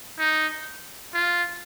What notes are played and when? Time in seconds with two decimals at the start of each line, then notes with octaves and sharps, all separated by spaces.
0.19 D#4
1.14 F4